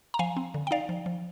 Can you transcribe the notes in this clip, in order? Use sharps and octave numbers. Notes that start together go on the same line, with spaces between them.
A#5
F3 F5 G#5
C4
D3
G5
D#4 D5 F5
F3
F3